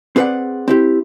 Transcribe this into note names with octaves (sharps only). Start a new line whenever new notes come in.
C4 G#4 B4 C5 D5 F#5
C4 E4 G4